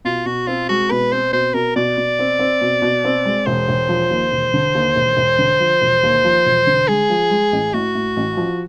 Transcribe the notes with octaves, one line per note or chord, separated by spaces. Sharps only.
B2 F4
B2 F#4
C4 F4
G#3 F#4
B2 B4
C4 C5
B2 C5
B2 A#4
B2 D5
B2
C4
C4
B2
B2
C4
G#3
E1 C5
E1
F3
D#2
E1
D3
D#2
E1
E1
D3
F3
E1
D#2
F3
E1
D3
G#3 G#4
F3
G#3
A1
A2 F#4
A2
A1
F3